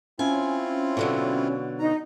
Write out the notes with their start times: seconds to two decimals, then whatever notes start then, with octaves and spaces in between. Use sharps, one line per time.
0.19 C4 C#4 E4 F4 G#5
0.97 B2 D3 F#3
1.79 D#4 A#5